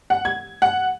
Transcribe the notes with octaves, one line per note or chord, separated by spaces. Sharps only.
F#5
G#6
F#5